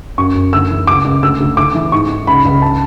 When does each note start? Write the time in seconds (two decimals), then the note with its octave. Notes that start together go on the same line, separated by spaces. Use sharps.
0.18 F#2 C#6
0.35 F#2
0.53 D2 E6
0.70 E3
0.87 C#2 D6
1.05 C#2
1.23 D2 E6
1.40 D2
1.57 D2 D6
1.75 E3
1.92 G#2 C#6
2.10 G#2
2.27 C#2 B5
2.45 C#2
2.62 A5